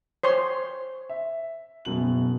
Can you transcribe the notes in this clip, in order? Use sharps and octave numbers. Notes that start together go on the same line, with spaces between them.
C5 C#5 C6
E5
F#1 B2 F#7